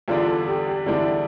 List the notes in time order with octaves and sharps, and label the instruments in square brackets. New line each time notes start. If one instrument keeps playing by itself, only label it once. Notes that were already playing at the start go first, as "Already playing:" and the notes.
[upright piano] E2 D3 G3 D4 [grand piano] F4
[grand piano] A4
G4
G4
[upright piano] E2 D3 G3 D4 [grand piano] E4